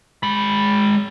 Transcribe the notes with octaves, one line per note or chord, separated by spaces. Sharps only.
G#3 B5